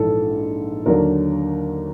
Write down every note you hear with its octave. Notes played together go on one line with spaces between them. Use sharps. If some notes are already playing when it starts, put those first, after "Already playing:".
Already playing: A#1 G#2 E3 A4
D#2 D3 F#3 A#3 D4 A#4